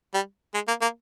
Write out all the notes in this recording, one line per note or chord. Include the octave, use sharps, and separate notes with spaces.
G3
G#3
A#3
A#3